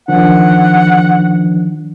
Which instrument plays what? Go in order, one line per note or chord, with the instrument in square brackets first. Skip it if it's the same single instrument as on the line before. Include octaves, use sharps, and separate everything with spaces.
[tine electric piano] D#3 F3 D4 [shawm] F#5